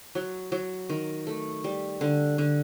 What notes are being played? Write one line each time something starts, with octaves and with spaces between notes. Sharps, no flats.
F#3
F#3
D#3
A3
G3
D3
D3